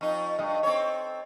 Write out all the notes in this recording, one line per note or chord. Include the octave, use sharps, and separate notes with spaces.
F2 D#4 C#6
G2 D#5
C4 A4 C#5